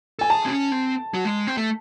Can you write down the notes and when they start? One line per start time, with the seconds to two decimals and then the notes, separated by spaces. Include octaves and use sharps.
0.19 A4 G#5
0.30 G#4 A5
0.46 C4
0.50 C#4
0.72 C4
1.14 F#3
1.25 G#3
1.47 C4
1.57 A3